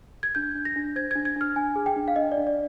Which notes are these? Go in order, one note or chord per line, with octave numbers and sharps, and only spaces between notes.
G#6
D4 G6
D4
A#6
D4
C5 G#6
D4 G#6
G#6
D4 F6
D4 G#5
G#4
G5
D4
F5
D4 D#5
D5
D4
D5